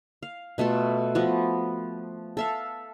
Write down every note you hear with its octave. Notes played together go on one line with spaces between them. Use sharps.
F5
B2 A3 F4 A4
F3 B3 F#4
A4 E5 F5